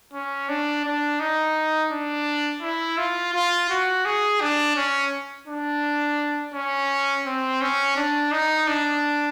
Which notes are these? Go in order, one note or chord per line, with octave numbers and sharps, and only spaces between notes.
C#4
D4
D4
D#4
D4
E4
F4
F4
F#4
G#4
D4
C#4
D4
C#4
C4
C#4
D4
D#4
D4